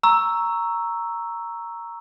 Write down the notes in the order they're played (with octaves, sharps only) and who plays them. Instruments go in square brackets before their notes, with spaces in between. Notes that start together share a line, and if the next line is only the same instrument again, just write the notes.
[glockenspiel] A#5 C#6 E6